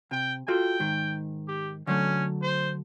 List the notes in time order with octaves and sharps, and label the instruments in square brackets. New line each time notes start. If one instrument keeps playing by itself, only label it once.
[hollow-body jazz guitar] C3 [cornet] G5
[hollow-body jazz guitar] F4 F#4 A4 [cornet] G5
[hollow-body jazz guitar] G#2 D#3
[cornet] G4
[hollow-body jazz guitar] D3 F#3 A3 [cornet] C#4
[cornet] C5